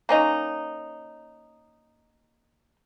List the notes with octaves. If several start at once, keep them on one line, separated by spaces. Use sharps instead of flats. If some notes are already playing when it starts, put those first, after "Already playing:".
A#3 C#4 D#4